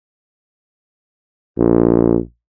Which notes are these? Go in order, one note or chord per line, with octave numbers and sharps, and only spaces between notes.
A#1